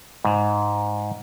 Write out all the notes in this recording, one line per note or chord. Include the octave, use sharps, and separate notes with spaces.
G#2